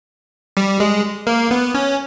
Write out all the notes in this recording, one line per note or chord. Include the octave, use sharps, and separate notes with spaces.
G3
G#3
A#3
B3
C#4